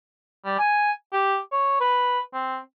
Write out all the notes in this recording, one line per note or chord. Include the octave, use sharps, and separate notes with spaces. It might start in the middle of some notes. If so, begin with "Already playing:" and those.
G3
G#5
G4
C#5
B4
C4